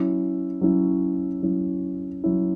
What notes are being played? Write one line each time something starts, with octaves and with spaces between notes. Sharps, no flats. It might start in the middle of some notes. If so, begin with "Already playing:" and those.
Already playing: F#3 C#4 E4
F#3 C#4 E4
F#3 C#4 E4
F#3 C#4 E4